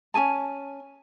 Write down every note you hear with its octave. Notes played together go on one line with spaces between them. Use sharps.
C#4 G4 G#5 A5